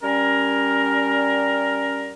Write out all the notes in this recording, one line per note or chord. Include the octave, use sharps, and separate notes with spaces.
G3 C#4 A#4